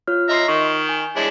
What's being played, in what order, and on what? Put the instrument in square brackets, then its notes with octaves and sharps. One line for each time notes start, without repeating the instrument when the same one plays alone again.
[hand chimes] F4 C#5 F6
[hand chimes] D#5 C6 C7 [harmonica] E5 A#5
[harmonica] D#3 [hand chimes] C#6
[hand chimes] G#5
[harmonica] G#3 D4 E4 [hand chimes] C#5